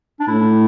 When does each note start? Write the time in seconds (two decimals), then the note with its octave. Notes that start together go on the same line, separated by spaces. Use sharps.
0.20 D4
0.28 A2 E4